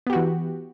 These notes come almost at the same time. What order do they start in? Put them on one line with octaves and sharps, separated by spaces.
B3 G4 F#4 E3